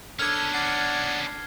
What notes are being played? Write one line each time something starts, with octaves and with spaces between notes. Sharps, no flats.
B3 C#4 D4 A4 F6 G#6
D5 F#5 C7